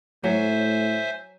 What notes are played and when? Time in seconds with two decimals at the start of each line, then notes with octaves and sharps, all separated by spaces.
0.24 A2 F#3 C5 E5 G#5